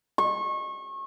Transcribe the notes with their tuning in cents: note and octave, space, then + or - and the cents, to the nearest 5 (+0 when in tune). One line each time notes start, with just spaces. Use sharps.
C#6 -30